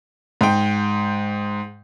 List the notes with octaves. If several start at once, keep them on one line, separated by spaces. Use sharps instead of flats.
G#2 G5